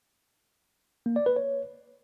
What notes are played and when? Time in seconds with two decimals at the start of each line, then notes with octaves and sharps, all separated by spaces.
1.06 A#3
1.16 D5
1.26 B4
1.36 C#5